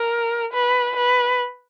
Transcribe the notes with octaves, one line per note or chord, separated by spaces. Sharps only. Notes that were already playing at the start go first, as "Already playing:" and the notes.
Already playing: A#4
B4
B4